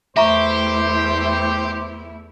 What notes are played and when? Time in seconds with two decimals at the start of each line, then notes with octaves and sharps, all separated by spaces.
0.17 E2 A3 E4 G4 C5 E5 A#5 C#6